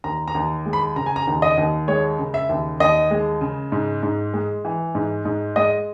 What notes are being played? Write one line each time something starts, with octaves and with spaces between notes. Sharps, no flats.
D#2 A#5
A#5
D#2
G#3
B5
C#3 A#5
G#5
A#5
D#2
D#5
D#2
G#3 C#5
C#3
E5
D#2
D#2 D#5
G#3
C#3
G#2
G#2
G#3
E3
G#2
G#2
G#3 D#5